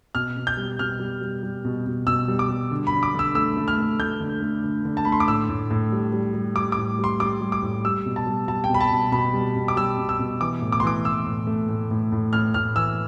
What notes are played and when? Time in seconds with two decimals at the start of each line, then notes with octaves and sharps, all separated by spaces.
0.15 B2 F6
0.37 B2
0.47 G6
0.57 G3
0.79 B2 F6
1.00 G3
1.21 G3
1.43 G3
1.65 B2
1.86 B2
2.07 B2 E6
2.28 G3
2.39 D6
2.49 G3
2.71 D3
2.87 B5
2.92 D3
3.03 D6
3.14 D3 E6
3.35 A3 E6
3.57 A3
3.68 F6
3.77 A3
3.99 A3 G6
4.20 D3
4.42 A3
4.64 D3
4.85 D3
4.97 A5
5.05 A3 B5
5.12 C6
5.20 D6
5.28 A2 E6
5.49 A2
5.70 A2
5.92 G3
6.13 G3
6.34 G3
6.56 G3 D6
6.72 A2 D6
6.99 G3 C6
7.20 G3 D6
7.41 G3
7.52 D6
7.63 A2
7.84 G3 E6
8.06 B2
8.16 A5
8.27 G3
8.48 G3 A5
8.64 G5
8.70 B2 B5
8.81 A5
8.91 B2
9.12 B2 B5
9.34 G3
9.56 B2
9.68 D6
9.76 G3 E6
9.98 B2
10.09 E6
10.19 B2
10.40 E3 D6
10.61 A2
10.72 D6
10.80 C6
10.83 E3 D6
11.05 E3 E6
11.27 A2
11.47 A3
11.69 A2
11.91 A2
12.12 A2
12.33 A2 F6
12.54 A2 F6
12.76 E3 E6